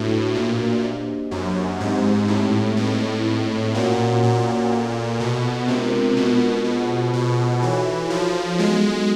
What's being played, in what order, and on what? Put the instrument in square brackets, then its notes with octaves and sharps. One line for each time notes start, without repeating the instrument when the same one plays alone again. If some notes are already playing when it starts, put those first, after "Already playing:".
Already playing: [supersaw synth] A2 [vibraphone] D4 F#4 B4 E5
[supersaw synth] A#2
[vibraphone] A#3 D4 G4 C5 D#5
[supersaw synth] F#2
[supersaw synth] G#2 [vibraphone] G#3 C4 D#4 G4
[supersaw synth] A2
[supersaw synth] A2 [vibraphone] C4 D#4 G#4 B4 D#5
[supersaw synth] A#2 [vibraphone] C#4 F#4 A#4 C#5 F#5
[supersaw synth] A#2
[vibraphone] F4 A4 D5
[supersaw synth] B2
[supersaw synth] C3 [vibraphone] G#3 B3 D4 F4 A#4
[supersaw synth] B2
[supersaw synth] B2 [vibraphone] F4 G#4 C5
[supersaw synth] B2
[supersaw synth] E3 [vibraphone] D#4 F#4 A4 C#5
[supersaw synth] F3
[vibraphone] F#3 B3 D#4 F#4 A4 [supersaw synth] G#3